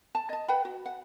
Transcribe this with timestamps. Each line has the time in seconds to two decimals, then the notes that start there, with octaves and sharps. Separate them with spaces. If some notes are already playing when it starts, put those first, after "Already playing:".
0.15 A5
0.29 D#5 A5
0.48 B4 F#5 G5 B5
0.65 F#4
0.86 F#5